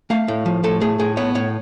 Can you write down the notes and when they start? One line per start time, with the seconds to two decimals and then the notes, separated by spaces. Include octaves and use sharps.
0.10 A3 F5
0.28 A2
0.46 F3
0.64 A2 A4
0.81 A3 G#4
0.99 A2 G#4
1.17 B3 C#5
1.35 A2 C#5